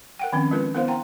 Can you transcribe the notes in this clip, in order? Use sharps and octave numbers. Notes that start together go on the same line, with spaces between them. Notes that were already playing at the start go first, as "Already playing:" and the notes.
A#4 F#5 G5
D#3 F3 C4 C#4
G#3 D4 F4 A#4 B4
B3 E4 A#4 C5 F5
F#5 G5 A#5 C6